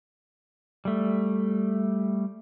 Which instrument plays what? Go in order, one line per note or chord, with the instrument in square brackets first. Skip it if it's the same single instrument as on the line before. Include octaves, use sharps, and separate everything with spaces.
[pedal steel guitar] G3 A3